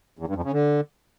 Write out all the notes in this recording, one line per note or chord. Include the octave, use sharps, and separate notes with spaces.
E2
G2
F2
C#3
D3